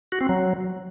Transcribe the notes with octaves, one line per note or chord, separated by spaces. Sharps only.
F#4
C4
F#3